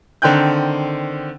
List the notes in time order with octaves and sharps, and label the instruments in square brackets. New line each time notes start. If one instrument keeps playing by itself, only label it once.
[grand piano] D3 D#3 C4 G5 F#6 G6